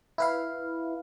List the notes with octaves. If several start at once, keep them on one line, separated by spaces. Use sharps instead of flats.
E4 B4 F5